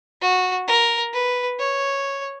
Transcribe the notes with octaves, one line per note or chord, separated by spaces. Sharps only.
F#4
A#4
B4
C#5